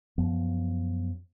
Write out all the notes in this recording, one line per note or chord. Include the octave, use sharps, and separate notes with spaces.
F#2 F3 B3